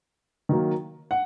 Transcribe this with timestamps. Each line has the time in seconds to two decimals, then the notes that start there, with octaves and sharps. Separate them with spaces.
0.49 D#3 F#3 A#3
1.11 F#5